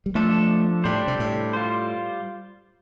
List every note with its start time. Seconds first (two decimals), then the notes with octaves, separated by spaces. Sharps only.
0.06 G3
0.15 F3 A3 D4 A4
0.84 A2 G3 D4 G4 C5
1.08 C3
1.20 A2
1.53 G3 F4 C5